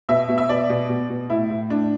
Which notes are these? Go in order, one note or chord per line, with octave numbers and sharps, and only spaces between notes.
B2 E5
B2
E5
B2 D5
B2
B2
B2
A2 E4
A2
A2 D4